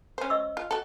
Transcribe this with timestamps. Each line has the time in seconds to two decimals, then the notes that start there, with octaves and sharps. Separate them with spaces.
0.18 C#4 C5
0.30 D#5 C#6 E6
0.57 F4
0.71 F#4 A4